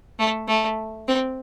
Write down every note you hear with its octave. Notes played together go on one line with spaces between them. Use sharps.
A3
A3
C4